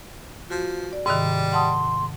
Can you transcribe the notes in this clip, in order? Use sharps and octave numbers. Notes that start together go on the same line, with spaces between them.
F3 F#4
D5
G#2 C3 D#3 G3
F#5 A5 C6 D#6